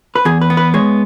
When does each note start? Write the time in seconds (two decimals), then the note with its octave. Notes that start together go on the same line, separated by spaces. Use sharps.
0.15 B4
0.25 E2 G#4
0.41 B4
0.50 B3
0.57 B4
0.74 G#3 C#5